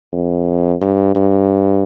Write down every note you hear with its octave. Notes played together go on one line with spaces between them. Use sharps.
F2
G2
G2